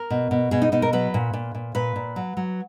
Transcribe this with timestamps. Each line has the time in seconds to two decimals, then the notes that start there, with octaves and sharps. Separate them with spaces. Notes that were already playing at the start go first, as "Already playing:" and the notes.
Already playing: A#4
0.10 B2
0.31 B2
0.51 B2 G#4
0.62 D#4
0.72 B2 D#4
0.82 A#4
0.93 F#3 B4
1.14 A#2
1.33 A#2
1.55 A#2
1.75 A#2 B4
1.96 A#2
2.16 F#3
2.37 F#3